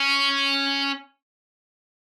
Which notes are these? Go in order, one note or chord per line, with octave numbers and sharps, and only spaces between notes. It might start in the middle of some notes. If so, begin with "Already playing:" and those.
Already playing: C#4